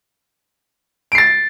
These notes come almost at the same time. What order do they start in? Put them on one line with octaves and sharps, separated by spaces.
D7 C7 A6